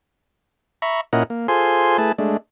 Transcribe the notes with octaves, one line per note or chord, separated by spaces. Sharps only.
E5 A#5 B5 C#6
A#2 C#4 E4 A#4 D#5 F#5
A#3
F4 G#4 A4 C5 G#5 C6
A3 E4 G#4 B4 A5
G#3 A3 D4